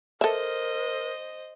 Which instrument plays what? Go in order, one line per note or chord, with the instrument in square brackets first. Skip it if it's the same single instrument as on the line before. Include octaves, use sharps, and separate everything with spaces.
[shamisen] A4 E5 [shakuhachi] A#4 [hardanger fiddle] C5 D#5